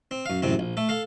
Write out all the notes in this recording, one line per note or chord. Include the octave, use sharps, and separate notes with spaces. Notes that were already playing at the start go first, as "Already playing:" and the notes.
C4
F#2 F5
A1 F#2 C3 C4
A#1
A3 A4
A4 F5